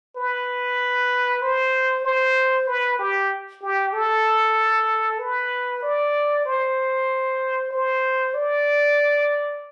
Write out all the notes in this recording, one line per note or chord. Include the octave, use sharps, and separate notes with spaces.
B4
C5
C5
B4
G4
G4
A4
B4
D5
C5
C5
D5